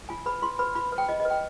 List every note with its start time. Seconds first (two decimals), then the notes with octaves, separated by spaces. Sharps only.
0.09 F4 G#5
0.26 B4 B5
0.42 F4 C6
0.59 B4 B5
0.75 F4 B5
0.92 B4
0.98 G5
1.08 F4 D#5
1.20 D#5
1.25 B4
1.30 G5